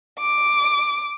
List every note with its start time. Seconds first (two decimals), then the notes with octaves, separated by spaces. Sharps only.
0.19 D6